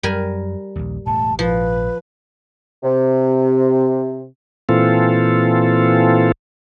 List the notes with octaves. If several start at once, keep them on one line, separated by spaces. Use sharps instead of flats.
F#2 G3 A#4 G#5
A#1 D#2
E1 A2 A3 A5
A#1 G#2 F3 B4
C3
A#2 E3 C4 F4 A4